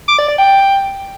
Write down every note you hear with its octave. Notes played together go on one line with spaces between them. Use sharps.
D6
D5
D5
G5